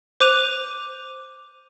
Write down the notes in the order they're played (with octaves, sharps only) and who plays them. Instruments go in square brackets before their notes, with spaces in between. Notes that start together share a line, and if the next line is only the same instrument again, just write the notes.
[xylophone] C5 D6 F#6 D#7 F7